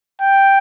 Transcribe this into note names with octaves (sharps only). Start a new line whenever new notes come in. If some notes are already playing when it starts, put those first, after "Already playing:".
G5